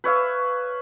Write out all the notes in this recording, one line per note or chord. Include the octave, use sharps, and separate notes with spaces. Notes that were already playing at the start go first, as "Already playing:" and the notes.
B4 C#5 E5 F5